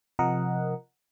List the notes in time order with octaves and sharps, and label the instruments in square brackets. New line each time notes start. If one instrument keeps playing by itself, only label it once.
[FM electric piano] C3 F3 A#4 D#5 F#5